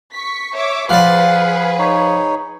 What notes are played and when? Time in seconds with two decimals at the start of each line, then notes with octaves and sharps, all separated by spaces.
0.14 C#6 B6
0.56 C#5 E5 D6
0.89 F3 G#4 B4 D5 F5 F#5 B5
1.79 D#4 C#5